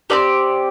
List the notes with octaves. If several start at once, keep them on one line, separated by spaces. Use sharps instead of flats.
C4 D#4 G4 D5